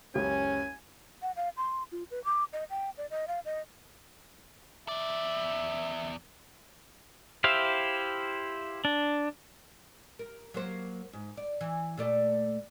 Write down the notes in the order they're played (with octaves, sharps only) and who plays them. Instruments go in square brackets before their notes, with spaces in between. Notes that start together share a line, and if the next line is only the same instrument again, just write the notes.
[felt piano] F#1 C#2 G4 [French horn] C#4 [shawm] G#5
[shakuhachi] F#5
F5
C6
F4
B4
D6
D#5
G5
D5
D#5
F5
D#5
[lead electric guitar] E2 D5 [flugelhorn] E5
[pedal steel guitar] E4 G4 C5 E5 F5
D4
[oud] A#4
F#3 A#3 C5
G#2
D5
E3
A#2 A3 D5